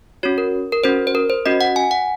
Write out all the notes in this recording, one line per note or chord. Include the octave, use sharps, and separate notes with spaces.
C#4 F#4 C#5
A#4
A#4
C#4 F#4 C5
C5
A#4
C5
C#4 F#4 D#5
F#5
G#5
F#5